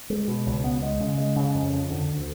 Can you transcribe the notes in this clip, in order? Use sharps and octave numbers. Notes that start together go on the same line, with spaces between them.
G#3
B2
C#2
B3
G#3
C#3
G#3
C#3
F2
F3
D3
D2